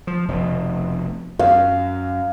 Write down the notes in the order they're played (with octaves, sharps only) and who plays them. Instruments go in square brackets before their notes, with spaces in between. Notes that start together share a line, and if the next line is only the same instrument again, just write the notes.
[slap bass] F3
F1 B2
[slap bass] F#2 [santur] F5